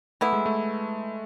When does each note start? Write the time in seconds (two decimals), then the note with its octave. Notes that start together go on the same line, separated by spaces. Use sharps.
0.21 E3 A3 B3 E4
0.33 G#3
0.46 A3